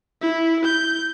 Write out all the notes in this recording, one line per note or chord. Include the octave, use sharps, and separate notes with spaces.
E4
G6